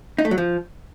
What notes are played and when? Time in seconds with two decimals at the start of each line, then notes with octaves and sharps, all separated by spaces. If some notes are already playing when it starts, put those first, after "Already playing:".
0.18 D#4
0.25 A3
0.31 F#3
0.38 F3